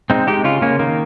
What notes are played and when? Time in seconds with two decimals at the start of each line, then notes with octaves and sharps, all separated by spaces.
0.10 G#3 C4 D#4
0.27 G#3 D#4 G4
0.44 C#3 C#4 F4
0.61 C#3 A#3 C#4
0.79 D#3 A#3